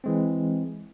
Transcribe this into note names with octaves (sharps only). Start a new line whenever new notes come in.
E3 G#3 C4